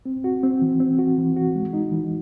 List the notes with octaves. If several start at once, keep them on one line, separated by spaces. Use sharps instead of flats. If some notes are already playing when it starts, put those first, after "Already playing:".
C4
F#4
C4
E3
C4
F#4
E3
F#4
G#3
D#4
E3